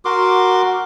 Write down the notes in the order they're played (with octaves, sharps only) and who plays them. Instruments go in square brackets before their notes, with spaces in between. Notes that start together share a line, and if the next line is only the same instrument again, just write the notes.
[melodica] F#4 A#4 C6 D6